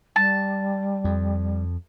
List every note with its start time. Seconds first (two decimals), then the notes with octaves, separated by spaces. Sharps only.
0.16 G3 A5
1.04 F2